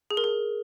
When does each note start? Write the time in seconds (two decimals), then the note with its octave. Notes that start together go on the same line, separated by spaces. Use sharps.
0.11 G#4
0.17 A#4
0.24 G#4